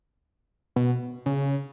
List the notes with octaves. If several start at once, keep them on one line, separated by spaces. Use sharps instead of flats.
B2
C#3